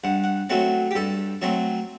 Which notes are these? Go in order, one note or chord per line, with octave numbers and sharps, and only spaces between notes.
G2 F#5
F#5
F#3 A3 C4 F#5
G4
G2 A4
F#3 A3 C4